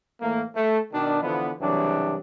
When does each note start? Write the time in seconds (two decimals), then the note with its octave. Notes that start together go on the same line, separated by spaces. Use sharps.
0.21 A2 E3 A3 A#3
0.55 A3
0.93 B2 D#3 D4
1.22 D3 E3 F3 B3
1.61 C2 C#3 E3 F#3 D4 G4